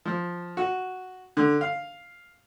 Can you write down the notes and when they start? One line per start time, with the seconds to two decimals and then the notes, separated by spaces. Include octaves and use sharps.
0.05 F3
0.57 F#4
1.37 D3
1.61 F5